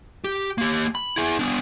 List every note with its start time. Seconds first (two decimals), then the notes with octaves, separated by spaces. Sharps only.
0.24 G4
0.58 A#3 G4
0.95 B5
1.16 E4 G#4
1.39 B3 D4